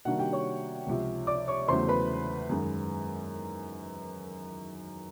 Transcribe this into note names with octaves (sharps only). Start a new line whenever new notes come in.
C3 D#3 G3 A#3 D4 F#4 F#5
G4 G5
C#5 C#6
C#2 C3 F3
D5 D6
C#5 C#6
E2 C#3 F#3 A3 C5 C6
B4 B5
F#2 D#3 G#3